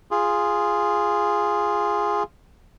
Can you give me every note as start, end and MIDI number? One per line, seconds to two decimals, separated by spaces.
0.11 2.23 65
0.11 2.23 68